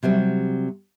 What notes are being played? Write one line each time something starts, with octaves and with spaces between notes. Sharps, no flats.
C3 F#3 G3 C4